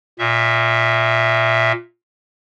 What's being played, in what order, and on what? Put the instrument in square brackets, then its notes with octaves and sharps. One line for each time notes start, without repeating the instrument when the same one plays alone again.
[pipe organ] A#2 E5